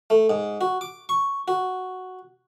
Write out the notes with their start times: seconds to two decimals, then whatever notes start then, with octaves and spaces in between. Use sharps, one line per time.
0.10 A3
0.30 G#2
0.61 F#4
0.81 D6
1.09 C#6
1.48 F#4